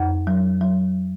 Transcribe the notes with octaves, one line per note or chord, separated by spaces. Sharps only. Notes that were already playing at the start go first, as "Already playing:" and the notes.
Already playing: F2
F#3
F#3